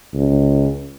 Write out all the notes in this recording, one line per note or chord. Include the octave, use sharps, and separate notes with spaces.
C#2